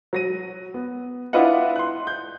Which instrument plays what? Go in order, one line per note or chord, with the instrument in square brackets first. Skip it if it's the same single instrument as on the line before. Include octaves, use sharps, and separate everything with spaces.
[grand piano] F#3 A#6 D#7
B3
D4 E4 F4 B4 D#5 F#5
C6 F#6
G6